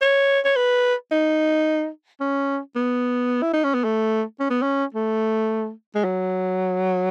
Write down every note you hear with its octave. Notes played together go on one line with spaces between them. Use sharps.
C#5
C#5
B4
D#4
C#4
B3
E4
D#4
C#4
B3
A3
C#4
B3
C#4
A3
G#3
F#3